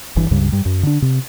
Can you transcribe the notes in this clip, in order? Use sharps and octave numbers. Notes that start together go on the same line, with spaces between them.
G1 G2 E3
C#2 G2 C#3 G3
G2 G3
F#2
D3 D4
C3